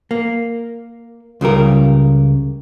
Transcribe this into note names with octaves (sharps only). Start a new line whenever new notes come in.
A#3
C#2 C#3 G3 A#4